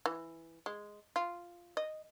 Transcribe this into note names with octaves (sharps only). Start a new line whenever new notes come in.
E3
G#3
F4
D#5